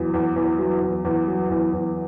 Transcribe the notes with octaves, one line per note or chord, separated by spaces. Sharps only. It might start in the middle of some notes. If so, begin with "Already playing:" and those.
Already playing: E2 F#3
E2
E2
F#3
E2
E2
F#3
E2
E2